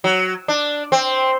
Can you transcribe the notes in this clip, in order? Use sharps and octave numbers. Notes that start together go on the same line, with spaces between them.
F#3
D4
C4